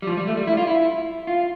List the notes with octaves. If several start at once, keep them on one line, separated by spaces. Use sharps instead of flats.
G3
F3
G3
A3
G3
E4
F4
E4
F4